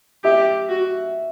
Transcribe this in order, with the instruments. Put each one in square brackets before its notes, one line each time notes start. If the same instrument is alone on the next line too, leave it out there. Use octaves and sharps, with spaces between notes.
[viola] G4 [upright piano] E5
[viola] F#4